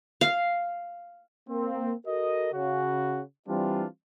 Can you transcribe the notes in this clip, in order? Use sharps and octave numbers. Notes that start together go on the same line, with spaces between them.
F5
A#3 C4
F#4 A4 A#4 D#5
C#3 F#4
E3 G3 C4 D4 F4